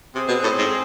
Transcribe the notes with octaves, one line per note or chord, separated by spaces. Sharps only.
C3 C4 G#4 C5 G#5
B2
A2
G#2